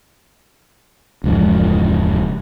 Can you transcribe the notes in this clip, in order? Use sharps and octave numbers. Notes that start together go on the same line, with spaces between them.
E1 C#2 G#2 F3